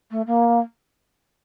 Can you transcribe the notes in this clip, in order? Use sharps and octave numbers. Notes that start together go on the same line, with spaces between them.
A3
A#3